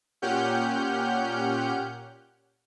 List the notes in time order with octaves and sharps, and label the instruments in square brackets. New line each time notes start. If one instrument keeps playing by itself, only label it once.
[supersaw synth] A#2 C#4 G4 F#5 F6 G6